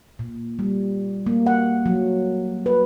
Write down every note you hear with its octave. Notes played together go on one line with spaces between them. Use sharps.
A#2
G3
A#3
F#5
F#3
B4